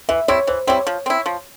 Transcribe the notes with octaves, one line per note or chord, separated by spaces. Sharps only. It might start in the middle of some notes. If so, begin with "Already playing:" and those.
E3 E5
G3 C4 E4 C#5
E3 C5
G3 C4 E4 C#5
F3
C4 E4
F3